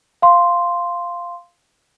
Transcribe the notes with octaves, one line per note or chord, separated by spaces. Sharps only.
F5 C6